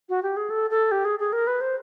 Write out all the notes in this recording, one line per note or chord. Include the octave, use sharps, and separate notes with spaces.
F#4
G4
G#4
A4
A4
G4
G#4
G#4
A#4
B4
C5